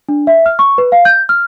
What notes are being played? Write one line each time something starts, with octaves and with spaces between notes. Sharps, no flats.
D4
E5
F6
C#6
B4
F5
G6
F6